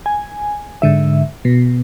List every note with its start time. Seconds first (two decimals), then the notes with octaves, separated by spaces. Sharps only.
0.06 G#5
0.82 G#2 D3 E5
1.45 B2